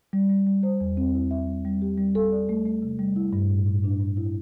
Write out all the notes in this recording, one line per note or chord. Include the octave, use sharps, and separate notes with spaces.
G3
G3
G3
C5
E2
C4
E4
E5
G3
G3
G4
G3
A4
D5
A3
A3
C3
G3
E4
G2
A2
A2
D4
G2
E4